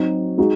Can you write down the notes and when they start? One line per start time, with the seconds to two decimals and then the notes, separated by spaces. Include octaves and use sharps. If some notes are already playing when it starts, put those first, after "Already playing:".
Already playing: F#3 C4 D#4 F#4
0.38 G#3 D#4 F#4